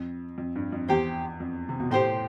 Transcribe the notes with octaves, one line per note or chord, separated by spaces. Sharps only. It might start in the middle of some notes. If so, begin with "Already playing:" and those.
Already playing: F2
F2
G2
F2
E2 G4 C5 G5
F2
C3
B2
A2 G4 C5 G5 C6